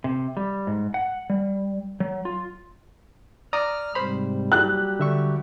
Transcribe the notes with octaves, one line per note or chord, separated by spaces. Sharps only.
C3
G3
G#2
F#5
G3
F#3
F4
D5 A#5 D#6 F6
G#2 C3 G3 C5 B5
F#3 G3 G4 F#6
D3 E5 C#6